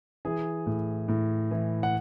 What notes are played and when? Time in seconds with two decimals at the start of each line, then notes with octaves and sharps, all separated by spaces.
0.25 E3 G#4 G#5
0.66 A2
1.08 A2
1.51 E3
1.83 F#5